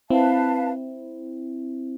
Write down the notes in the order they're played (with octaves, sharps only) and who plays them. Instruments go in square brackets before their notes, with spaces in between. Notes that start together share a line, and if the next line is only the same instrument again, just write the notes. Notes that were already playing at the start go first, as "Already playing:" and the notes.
[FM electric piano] C4 E4 [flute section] B4 F5 A5